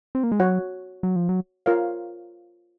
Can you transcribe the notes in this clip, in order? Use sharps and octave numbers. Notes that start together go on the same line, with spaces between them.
C4
A#3
G#3
F#3 F#4 C#5 F#5
F#3
F3
F#3
F4 A#4 C#5 F5